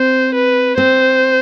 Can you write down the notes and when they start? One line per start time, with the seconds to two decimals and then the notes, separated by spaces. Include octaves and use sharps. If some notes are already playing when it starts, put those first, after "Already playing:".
Already playing: C4 C5
0.35 B4
0.78 C4 C5